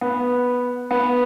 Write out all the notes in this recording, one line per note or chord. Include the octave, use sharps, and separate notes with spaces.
B3
B3